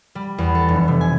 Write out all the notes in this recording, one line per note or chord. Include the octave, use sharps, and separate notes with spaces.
G3
E2
A4
F1
C3
G#5